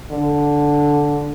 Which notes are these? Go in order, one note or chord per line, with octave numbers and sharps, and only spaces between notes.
D3